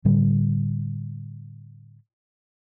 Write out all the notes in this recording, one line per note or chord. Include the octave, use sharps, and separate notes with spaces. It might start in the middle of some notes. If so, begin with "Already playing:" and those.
A2 D3 G3